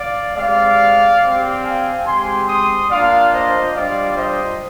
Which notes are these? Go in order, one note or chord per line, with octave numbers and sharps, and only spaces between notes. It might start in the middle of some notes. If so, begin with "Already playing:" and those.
Already playing: D5 F5
G#3 C4 G4 D5 F5
C4 G4
F5 G#5
G#3 C4 G4 G#5 C6
C6 D#6
A#3 D4 F4 D5 F5
C5 D#5
G3 D4 F4 D5 F5
C5 D#5